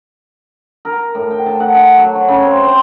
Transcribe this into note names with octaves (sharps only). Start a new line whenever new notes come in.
A#4
A2
G5
A5
F#5
F#5
F#3
C#5
C#3
C4
C5